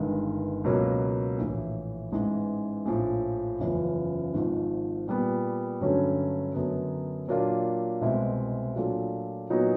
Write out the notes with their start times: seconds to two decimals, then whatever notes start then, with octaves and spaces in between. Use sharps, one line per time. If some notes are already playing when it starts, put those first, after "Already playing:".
Already playing: G1 G2 D#3 G#3
0.64 C#2 B2 F#3 A#3
1.38 A#1 A2 E3
2.12 A1 G#2 E3 G#3
2.86 A#1 A2 F3
3.60 F#1 E2 C#3 F3
4.34 G#1 G#2 F3
5.08 A#2 G3 B3
5.81 G2 D3 F#3 A3 C#4
6.54 F#2 D3 F#3 B3
7.28 A#2 F#3 A#3 D4 F4
8.01 C2 B2 G#3 C4 E4
8.76 A#2 F#3 A3 D4 F4
9.50 A#2 F#3 B3 D#4 F#4